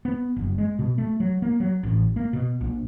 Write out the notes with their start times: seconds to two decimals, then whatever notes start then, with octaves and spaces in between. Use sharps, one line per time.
0.05 B3
0.36 F#1
0.58 G#3
0.79 B2
0.98 A3
1.20 F#3
1.42 A#3
1.60 F#3
1.83 A1
2.16 A#3
2.33 B2
2.61 A#1